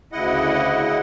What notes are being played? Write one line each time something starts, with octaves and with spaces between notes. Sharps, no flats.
D2 C#3 E4 D#5 F#5